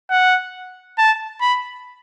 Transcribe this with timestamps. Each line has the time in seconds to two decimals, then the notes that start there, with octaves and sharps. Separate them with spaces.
0.10 F#5
0.98 A5
1.41 B5